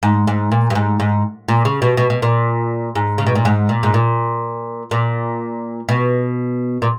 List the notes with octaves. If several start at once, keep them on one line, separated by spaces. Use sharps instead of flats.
G#2
G#2
A#2
G2
G#2
G#2
A#2
C#3
B2
B2
B2
A#2
G#2
C#3
B2
A#2
G#2
A#2
G#2
A#2
A#2
B2
A#2